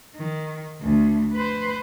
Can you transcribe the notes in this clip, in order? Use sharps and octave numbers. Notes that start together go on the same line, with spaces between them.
D#3
D2
B4 C5